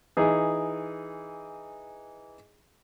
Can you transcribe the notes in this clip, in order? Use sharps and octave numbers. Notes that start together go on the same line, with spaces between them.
E3 D#4 G#4